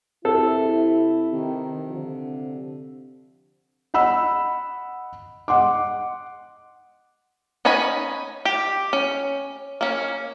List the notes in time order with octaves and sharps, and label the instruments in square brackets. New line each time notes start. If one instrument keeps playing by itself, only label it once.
[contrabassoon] C3 [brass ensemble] E4 [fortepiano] A4
[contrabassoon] C3 [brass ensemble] D#3
[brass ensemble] D3 F3
[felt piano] D#5 F#5 B5 E6
D#5 F#5 C6 D6
[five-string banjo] C#4 D#4 C#5 G#5 B5
G4
C#4
A#3 C#4